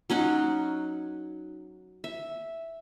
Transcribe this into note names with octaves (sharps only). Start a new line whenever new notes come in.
F#3 C#4 D#4 F#4
E5